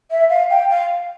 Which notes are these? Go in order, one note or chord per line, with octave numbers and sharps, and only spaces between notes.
E5
F5
G5
F5